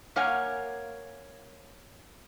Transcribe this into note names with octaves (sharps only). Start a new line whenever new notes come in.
A#3 A#4 C#5 F5 F#5 G#5